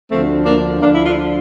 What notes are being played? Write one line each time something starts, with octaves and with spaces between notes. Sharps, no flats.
D2 D3 F3 A3 C4
A#3 D4
D2 D3 F3 A#3 D4
E4
D4 F4